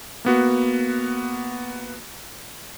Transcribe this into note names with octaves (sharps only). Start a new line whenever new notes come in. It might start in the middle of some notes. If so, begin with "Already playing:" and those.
A#3 B3 F#4